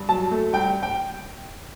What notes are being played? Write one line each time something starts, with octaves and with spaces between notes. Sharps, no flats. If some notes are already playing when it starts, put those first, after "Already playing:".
Already playing: G2
F#3 A5
A3
G2 G5
G5